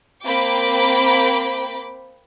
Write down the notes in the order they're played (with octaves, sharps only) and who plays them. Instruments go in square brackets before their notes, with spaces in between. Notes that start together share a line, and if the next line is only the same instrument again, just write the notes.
[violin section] A#3 C4 G5 B5 D6 D7